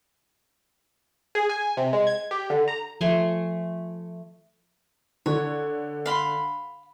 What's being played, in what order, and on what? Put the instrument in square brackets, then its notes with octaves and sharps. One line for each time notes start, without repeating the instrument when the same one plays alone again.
[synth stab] G#4
G#5
C3
G#3
G#6
G4
D3
A#5
[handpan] F3 [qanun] A3 G#5 C6
[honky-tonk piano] D3 [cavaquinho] C#5
[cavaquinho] F5 B5 C6